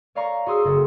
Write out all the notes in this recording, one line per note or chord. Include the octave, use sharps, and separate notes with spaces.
C#5 D5 F5 G#5 A#5 C#6
F#4 G#4 C6 D#6 E6
F#1 F#4 A4 E5